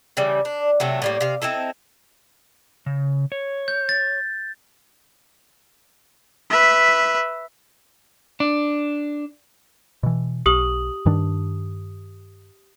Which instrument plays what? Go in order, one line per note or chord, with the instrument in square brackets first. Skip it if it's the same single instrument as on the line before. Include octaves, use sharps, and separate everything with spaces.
[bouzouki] C#3 E3 G3
D4
C3 F#3 A3
A2 G3 A#3
C3 F5
C4 D#4 E4 A4
[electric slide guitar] C#3
C#5
[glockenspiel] G6
A6
[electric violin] B4 E5
[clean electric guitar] D4
[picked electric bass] B2 E3
[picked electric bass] B1 [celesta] G4 D#6 F#7
[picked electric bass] G2 D#3 D4